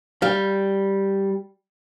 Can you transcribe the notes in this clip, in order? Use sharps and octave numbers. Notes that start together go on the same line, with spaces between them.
G3 F5